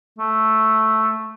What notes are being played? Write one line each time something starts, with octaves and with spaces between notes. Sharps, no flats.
A3